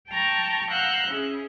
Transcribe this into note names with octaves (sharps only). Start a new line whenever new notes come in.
G5 A5 A#5 C#6
F5 F#5 A#5 E6 F#6 G6
C#4 E4 G#4